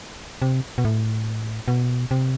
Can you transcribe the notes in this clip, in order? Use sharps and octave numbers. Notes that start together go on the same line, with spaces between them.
C3
B2
A2
B2
C3